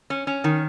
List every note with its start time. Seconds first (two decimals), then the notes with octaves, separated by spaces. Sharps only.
0.10 C#4
0.27 C#4
0.44 D#3